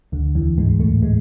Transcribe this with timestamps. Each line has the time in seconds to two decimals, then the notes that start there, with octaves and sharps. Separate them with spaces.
0.12 D2 D3
0.35 E2 E3
0.57 G#2 G#3
0.80 A2 A3
1.03 G#3